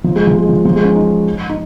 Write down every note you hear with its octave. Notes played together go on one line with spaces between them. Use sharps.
F3
G#3
F3
G#3
F3
F3
G#3
C#4
D#4
D#4